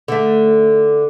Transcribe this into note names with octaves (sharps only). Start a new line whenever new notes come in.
D3 A3